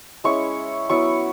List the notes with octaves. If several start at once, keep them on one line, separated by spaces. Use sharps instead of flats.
G#3 C#4 E4 C#6
F#3 B3 E4 C#6